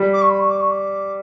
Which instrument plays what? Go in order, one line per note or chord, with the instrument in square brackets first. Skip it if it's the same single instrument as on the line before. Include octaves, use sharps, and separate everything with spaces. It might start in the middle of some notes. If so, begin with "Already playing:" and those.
Already playing: [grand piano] G3
[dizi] D6
C#6
B5
C#6
D6
C#6
D6